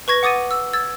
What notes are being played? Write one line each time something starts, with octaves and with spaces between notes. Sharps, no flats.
B4 C#6 G#6 A#6
F#5 D6 D#6 A6 D#7
E6
E6 G#6 A6